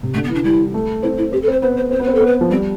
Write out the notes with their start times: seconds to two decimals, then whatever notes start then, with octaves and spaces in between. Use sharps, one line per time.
0.03 C3
0.14 D3 A3
0.24 B3
0.29 E3
0.35 D4
0.44 G3 E4
0.74 A3
1.03 C4 E4
1.17 E4
1.32 C4 G4
1.43 A4
1.48 C4
1.52 C5
1.62 B3 C5
1.77 C5
1.91 C4 C5
2.00 B3
2.03 C4 B4
2.15 A4
2.20 B3
2.26 B4
2.41 F3
2.50 G3 C4